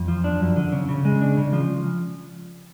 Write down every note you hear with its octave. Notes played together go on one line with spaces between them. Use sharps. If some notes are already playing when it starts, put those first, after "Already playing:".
Already playing: F2
F3
D4
F#2
D3
C#3
C#3
G#3
D4
C#3
F3